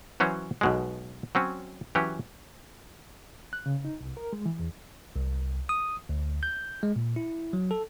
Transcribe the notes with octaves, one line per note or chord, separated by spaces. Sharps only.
E3 F#3 C#4 C5
B1 B2 G#3
F#3 C4 C#4
E3 F#3 C#4 G4
F#6
C#3
D#4
C2
A#4
G#3
E3
E2
C2
D#6
D2
G6
G#3
A#2
E4
F#3
A4